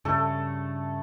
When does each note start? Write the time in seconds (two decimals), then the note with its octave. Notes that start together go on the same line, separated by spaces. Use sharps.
0.05 G2 C#3 A3 A4